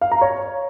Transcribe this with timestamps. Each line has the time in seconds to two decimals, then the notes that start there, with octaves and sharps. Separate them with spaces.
0.01 F5
0.11 A#5
0.21 C#5